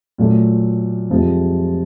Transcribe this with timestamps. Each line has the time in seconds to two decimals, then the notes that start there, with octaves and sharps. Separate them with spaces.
0.18 A#2 F#3 A3
1.10 F2 C3 F3 G#3